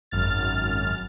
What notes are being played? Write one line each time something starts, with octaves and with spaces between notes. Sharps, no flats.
G#1 F#2 F6 A6